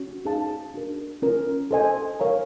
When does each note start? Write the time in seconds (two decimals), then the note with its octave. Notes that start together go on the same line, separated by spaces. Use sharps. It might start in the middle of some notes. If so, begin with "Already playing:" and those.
Already playing: C#4 F#4
0.25 D#4 G#4 C5 F5 A5
0.74 D4 F#4 A#4
1.22 C#4 F4 A#4
1.71 A4 C5 D#5 G#5
2.20 A#4 C#5 F5 A#5